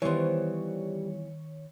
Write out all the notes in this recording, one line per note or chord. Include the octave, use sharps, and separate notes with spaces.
D#3 E3 G3 B3 F4 C5 C#5